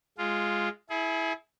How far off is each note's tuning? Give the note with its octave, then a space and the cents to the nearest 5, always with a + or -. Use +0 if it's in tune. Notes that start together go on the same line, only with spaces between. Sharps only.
G#3 +0 F4 +0
E4 -10 G#4 +30